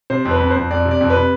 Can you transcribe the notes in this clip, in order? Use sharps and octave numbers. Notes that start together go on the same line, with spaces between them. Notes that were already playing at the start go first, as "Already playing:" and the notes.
C3 C5
F2
B4
F2
C5
F2
F2 D5
C3
D5
F2
B4
C3